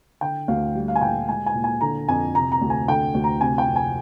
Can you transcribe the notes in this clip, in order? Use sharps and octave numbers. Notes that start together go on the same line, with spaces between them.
D3 G5
D2 F5
G3
F5
G#5
A#2 G5
G#3 G#5
G#5
A#2
G#5
D3 A#5
F2 G#5
C3 A#5
A#5
D2
G#5
D3 G5
D2
A#5
C3 G#5
G5
F2
G#5